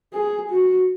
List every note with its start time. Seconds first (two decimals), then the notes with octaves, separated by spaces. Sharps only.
0.13 G#4
0.50 F#4